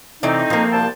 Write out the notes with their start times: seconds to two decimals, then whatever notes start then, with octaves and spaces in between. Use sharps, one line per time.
0.23 C3 E3 A3 C4 D#4 D5
0.50 F3 A#3
0.72 C2 G5 A5